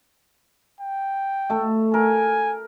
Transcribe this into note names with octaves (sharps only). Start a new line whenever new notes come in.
G5
A3 A4
A#4 G#5